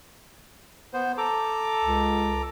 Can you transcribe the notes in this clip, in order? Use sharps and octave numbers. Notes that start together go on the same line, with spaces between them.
B3 C5
A4 A#5 D6
C#2